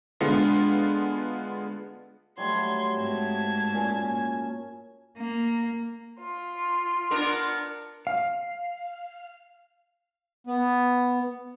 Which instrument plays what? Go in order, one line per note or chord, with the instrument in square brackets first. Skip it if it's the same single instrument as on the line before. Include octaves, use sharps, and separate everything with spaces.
[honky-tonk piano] D3 G#3 B3 F4
[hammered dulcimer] F#3 G3 A3 [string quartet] C6 G#6
[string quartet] G#2 A5 G#6 [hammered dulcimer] C4 F#4
[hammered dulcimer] A#2 C#4
[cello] A#3
[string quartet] F4 C6
[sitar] B3 D4 A#4
[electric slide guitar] F5
[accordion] B3